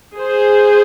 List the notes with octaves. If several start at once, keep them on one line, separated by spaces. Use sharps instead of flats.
G#4 C5